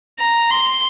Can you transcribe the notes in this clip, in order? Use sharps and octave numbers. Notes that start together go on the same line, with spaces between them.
A#5
C6